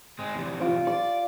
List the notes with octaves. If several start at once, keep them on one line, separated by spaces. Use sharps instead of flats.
G#3 C4
E2 C3
F4 D6
D5 D6